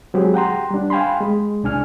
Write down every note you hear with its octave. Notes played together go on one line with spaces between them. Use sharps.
F#3 G#3 C4 G4 G#4
F#5 G5 A#5 C6
G3 D4
F5 G5 G#5 B5 C6
G#3
C2 D4 G#5 F6